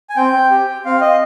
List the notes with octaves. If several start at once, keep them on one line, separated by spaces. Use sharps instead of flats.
G#5
C4 G5
G4
C4 F5
D#5